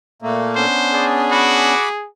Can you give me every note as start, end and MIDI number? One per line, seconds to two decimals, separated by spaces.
0.22 0.65 46
0.22 0.65 57
0.22 0.65 58
0.56 1.75 59
0.56 1.75 61
0.56 1.75 62
0.56 1.06 72
0.93 2.07 68
0.93 1.22 74
1.31 1.88 66
1.31 1.89 83
1.31 1.89 86